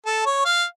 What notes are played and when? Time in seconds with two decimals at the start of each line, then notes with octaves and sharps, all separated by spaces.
0.06 A4
0.26 C#5
0.45 F5